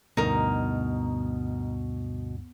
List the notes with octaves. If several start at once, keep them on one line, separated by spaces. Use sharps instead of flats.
D2 G2 B2 D#4 A#4